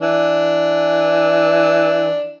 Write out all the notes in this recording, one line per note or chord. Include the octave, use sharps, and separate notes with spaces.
E3 D4